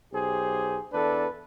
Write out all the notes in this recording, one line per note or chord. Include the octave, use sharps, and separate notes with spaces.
B1 G4 G#4 C5
E2 D4 A4 B4